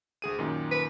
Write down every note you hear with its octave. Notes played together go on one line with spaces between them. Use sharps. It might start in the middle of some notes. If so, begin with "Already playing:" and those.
D2 G#4 D#7
F#2 A#2 D#3
B4